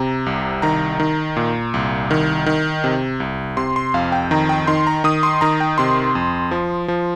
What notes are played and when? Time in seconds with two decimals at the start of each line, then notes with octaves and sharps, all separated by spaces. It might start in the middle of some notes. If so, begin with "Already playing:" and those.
Already playing: C3 A#5
0.26 C2
0.62 D#3 A#5
1.00 D#3
1.36 A#2
1.74 C2
2.11 D#3
2.46 D#3
2.84 C3
3.20 C2
3.57 C3 C6
3.76 C6
3.94 F2 F5
4.12 G5
4.31 D#3 A#5
4.49 G5
4.67 D#3 C6
4.87 A#5
5.04 D#3 D#6
5.23 C6
5.41 D#3 A#5
5.60 G5
5.78 C3 C6
6.15 F2
6.51 F3
6.88 F3